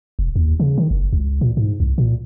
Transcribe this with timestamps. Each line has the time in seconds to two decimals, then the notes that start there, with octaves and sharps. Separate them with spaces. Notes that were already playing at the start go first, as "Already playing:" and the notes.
0.19 E1
0.36 D#2
0.60 C#3
0.78 D#3
0.90 F#1
1.13 C#2
1.41 A#2
1.57 G#2
1.80 C2
1.98 A#2